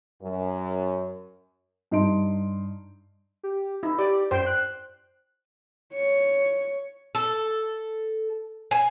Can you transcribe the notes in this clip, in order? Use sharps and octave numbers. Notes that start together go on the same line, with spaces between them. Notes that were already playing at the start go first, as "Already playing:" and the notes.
F#2
G2 D#4 C6 D7
G4
D#4 E4
G4 D5
F#2 C5 G5
F#6
C#5
A4
G#5